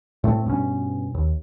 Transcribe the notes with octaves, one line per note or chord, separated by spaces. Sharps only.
A2 A3 C4
G2 B2 C#4
D#2